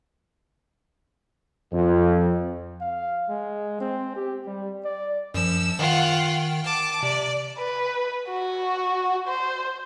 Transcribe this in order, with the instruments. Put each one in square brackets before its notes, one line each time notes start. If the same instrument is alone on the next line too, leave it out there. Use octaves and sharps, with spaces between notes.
[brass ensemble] F2
[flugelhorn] F5
G#3
C4
G4
G3
D5
[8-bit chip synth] F#2 F3 [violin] E6
[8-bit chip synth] D#3 G5 [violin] F4 F#5
[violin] A5 D6
[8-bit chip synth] C3 [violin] D5
[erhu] B4
F#4
C5